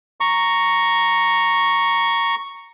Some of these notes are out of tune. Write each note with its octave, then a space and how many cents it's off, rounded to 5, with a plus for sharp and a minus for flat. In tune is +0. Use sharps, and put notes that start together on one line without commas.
A#5 +0 C#6 +0